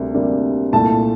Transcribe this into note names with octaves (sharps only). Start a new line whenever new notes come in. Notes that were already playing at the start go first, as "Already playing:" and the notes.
Already playing: D2 C3 G3 A#3 D4
D2 C3 G3 A#3 D4
C2 A#2 A3 A5